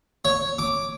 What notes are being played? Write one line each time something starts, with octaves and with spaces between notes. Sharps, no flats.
C#5
D6